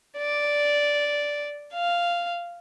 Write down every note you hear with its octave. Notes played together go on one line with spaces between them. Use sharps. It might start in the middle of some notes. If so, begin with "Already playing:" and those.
D5
F5